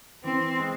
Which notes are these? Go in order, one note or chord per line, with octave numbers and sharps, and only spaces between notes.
E3 C4
G#3